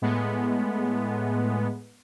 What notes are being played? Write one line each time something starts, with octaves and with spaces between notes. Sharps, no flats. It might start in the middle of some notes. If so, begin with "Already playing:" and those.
A2 G#3 B3